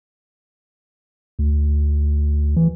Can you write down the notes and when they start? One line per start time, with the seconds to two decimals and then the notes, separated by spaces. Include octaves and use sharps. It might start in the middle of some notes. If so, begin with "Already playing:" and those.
1.39 D2
2.56 E3